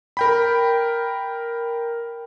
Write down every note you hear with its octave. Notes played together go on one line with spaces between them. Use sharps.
A#4 G5 B5